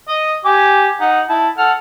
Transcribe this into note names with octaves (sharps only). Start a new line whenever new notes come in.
D#5
G4 G#5 D6
D#4 F#5
E4 A5
A4 F#5 F6